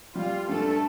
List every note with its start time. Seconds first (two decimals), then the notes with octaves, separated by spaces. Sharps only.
0.15 G3 F4
0.49 G2 A3 A4